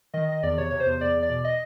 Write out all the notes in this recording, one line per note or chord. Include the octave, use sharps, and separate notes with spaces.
D#3 D#5
D#3 D#5
E2 D5
C3 C#5
C3 C#5
C5
E2
E2 D5
E2
D5
B2
D#5